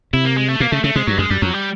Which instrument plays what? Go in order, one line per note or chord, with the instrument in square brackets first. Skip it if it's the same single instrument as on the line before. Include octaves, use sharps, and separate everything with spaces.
[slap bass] C3 [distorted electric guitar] E4
[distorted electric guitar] A#3
G#3
A3
[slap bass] B2 [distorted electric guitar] A#3
[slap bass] C#3 [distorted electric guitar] A3
[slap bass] C#3 [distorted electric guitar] A3
[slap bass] C3 [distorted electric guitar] G#3
[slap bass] G2 [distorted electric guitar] F#3
[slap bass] F#2 [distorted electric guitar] G#3
[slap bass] F#2 [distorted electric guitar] G3
[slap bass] F2 [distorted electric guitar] F#3
[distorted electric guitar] G3